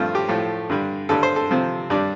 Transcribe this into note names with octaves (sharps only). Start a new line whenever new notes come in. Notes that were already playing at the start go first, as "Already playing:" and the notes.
Already playing: G2 F3 A3 C4 F4
G4
A2 F3 A3
G2 D3 G3
G2 D3 G3 A4
C5
A4
C3 F3 C4
G2 G3 D4